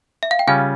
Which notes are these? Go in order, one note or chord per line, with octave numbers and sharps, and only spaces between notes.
E5
F5
G5
C#3 G3 C#4 F4 F5 G#5